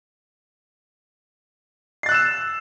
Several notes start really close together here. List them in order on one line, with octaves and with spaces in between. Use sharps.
C7 A6 F#6 E6 E7